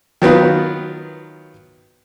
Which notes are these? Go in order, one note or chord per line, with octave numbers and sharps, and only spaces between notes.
D#3 F#3 B3 F4